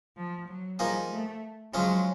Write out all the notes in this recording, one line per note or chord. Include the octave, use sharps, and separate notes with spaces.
F3
F#3
F3 G3 A#3 D#4 G#4
A3
C#3 F3 F#3 G#3 C#4